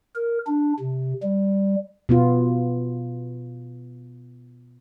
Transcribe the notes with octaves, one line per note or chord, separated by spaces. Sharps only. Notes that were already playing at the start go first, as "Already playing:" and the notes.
A#4
D4
C3
G3
B2 B3 F4